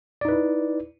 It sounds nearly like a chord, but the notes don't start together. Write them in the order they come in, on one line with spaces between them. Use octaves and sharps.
D5 D#4 B4 E4